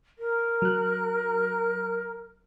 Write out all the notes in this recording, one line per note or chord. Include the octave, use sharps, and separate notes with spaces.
A#4
F#3 F#6